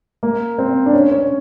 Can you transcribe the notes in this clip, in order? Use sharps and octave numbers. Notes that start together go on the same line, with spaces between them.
A#3
C4
D4
C#4
C#4